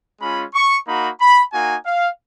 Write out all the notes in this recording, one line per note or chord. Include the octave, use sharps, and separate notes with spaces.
G#3 C#4 F4 B5
C#6
A#3 D#4 F#4 B5
B5
A#3 D#4 F#4 G#5
F5